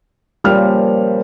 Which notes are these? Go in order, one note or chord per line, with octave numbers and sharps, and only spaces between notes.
A#2 C#3 F3 G3 F6